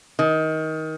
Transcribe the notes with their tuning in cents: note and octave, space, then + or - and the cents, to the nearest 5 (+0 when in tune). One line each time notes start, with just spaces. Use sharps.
D#3 +20